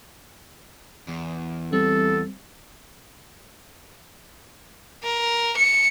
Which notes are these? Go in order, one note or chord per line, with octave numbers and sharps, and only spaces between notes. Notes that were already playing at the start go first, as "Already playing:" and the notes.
E2
G3 C4 A4
A#4
C#7